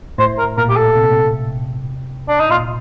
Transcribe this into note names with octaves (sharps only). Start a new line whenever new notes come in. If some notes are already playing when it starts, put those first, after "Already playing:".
A2 C5
A#4
A#2 A#4
G4
A4
C3
A#2
C3
D4
D#4
A#2 F4